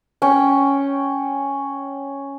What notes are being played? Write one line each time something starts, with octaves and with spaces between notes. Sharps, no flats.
C#4 G5